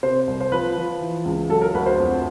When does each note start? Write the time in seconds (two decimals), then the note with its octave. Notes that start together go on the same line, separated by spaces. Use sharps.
0.03 C3 C5
0.27 C2
0.41 C5
0.52 F3 B4
0.76 F3
1.01 E3
1.25 C#2
1.49 F#3 A4
1.62 A#4
1.74 D2 B4
1.86 C5
1.99 F2